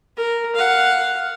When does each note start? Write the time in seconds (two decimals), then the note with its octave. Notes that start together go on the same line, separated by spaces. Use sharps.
0.17 A#4
0.55 F5 F#5